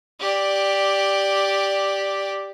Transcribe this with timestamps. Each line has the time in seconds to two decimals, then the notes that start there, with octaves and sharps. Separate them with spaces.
0.20 G4 D5